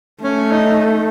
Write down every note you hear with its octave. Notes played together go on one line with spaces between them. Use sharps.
A3 C#4
D#4